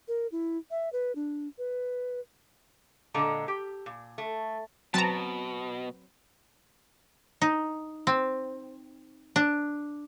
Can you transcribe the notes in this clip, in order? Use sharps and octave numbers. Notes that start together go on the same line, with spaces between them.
A#4
E4
E5
B4
D4
B4
A#2 D3 G#3 A4 D#5 A#5
G4
A#2
A3
B2 F#3 C4 B4 A5 A#5
D#4
C4
D4